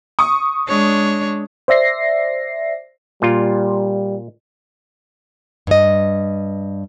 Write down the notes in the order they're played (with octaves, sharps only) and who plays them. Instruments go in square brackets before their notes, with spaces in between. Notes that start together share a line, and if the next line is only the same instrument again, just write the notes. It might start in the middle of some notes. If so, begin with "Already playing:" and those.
[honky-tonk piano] C#6 D#6
[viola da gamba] G#3 D4 C#5
[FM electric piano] C5 D5 E5 A#6 C7
[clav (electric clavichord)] A#2 F4 [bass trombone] G3
[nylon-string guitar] G2 D#5